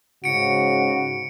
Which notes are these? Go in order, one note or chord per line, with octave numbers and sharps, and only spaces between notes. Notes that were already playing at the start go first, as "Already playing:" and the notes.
G#2 C#3 F#4 C#7 D7